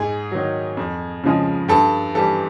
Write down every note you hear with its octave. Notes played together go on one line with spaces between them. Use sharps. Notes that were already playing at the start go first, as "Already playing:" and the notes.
Already playing: G#2 G#4
D#3 F#3
F2
C#3 F3 G#3
G2 A4
E3 G3 A4